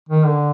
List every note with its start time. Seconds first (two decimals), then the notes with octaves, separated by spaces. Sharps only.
0.09 D#3
0.26 D3